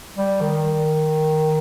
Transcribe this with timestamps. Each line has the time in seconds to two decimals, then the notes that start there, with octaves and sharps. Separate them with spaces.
0.16 G3
0.41 D#3